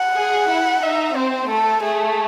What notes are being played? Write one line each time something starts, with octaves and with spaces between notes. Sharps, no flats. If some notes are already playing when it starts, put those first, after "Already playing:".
Already playing: F#5
G#4
E4
D#4 E5
C4 C5
A3 A4
A3 G#4